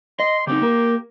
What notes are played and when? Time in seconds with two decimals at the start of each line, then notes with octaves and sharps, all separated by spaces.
0.20 D#5 C6
0.47 C#3 C4 D#4 G4
0.61 A#3 A#4